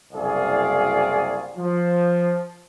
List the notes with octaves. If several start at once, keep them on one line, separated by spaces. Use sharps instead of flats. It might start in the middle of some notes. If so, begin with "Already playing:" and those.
F#1 C2 G#4 D5 F5
F3